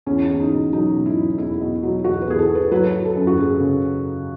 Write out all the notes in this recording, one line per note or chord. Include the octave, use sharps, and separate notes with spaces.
E2 C#4
E2
D#4
B2
F#3 D#4
B2
E4
F#3
E2 E4
B2
F#3
E2 F#4
B4
E2 G#4
A4
E2
B4
F#3 B4
F#3
A4
F#2
F#4
F#2 G#4
C#3